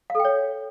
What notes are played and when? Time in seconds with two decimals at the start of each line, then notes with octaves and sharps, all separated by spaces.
0.10 F5
0.15 A4
0.20 G5
0.25 C#5